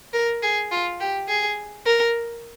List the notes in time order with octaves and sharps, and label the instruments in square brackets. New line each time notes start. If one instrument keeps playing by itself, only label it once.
[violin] A#4
G#4
F4
G4
G#4
A#4